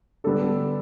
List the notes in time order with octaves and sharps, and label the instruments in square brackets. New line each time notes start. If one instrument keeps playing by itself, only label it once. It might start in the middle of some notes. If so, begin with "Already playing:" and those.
[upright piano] D3 G3 B3 A4